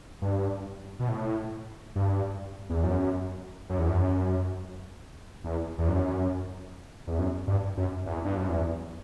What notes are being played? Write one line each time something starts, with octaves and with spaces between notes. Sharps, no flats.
G2
B2
A2
G2
E2
F#2
F#2
E2
F#2
E2
E2
F#2
E2
F#2
G2
F#2
E2
G2
F#2
E2